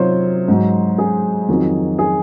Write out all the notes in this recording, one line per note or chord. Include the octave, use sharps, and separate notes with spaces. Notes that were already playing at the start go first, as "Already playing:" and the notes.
Already playing: C3 F#3 D#4 F4 C5 C#5
G#2 F#3
G#4
F2 D#3 F#3
G#4